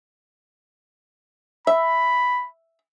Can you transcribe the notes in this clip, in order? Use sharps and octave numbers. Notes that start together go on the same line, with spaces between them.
E5 B5